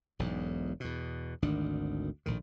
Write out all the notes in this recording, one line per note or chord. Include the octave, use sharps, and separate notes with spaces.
E1 B1 G#2
E2 B2
G#1 D2 D#3 D4
A#1 A2 D#3